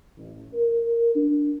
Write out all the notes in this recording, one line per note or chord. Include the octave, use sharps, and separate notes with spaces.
A1
A#4
D4